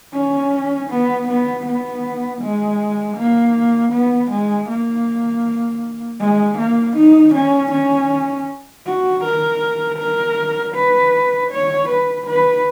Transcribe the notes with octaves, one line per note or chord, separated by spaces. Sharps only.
C#4
B3
B3
B3
G#3
A#3
B3
G#3
A#3
G#3
A#3
D#4
C#4
C#4
F#4
A#4
A#4
B4
C#5
B4
B4